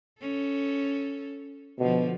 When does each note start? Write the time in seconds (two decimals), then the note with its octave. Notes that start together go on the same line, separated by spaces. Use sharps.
0.21 C#4 A4
1.79 B2 D3 F3